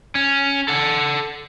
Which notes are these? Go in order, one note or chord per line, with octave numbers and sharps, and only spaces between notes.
C#4
A4 F#5